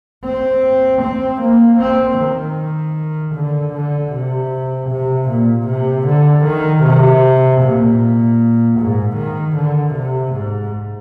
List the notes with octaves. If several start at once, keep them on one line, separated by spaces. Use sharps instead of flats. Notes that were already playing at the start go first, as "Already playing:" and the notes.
C4
C4
A#3
C4
D#3
D3
D3
C3
C3
A#2
C3
D3
D#3
C3
A#2
G#2
D#3
D3
C3
G#2